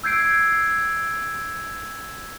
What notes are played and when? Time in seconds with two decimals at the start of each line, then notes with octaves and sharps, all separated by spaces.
0.04 E6 G6 G#6 C7 D7